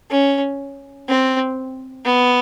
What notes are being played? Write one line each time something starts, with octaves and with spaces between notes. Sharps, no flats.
C#4
C4
B3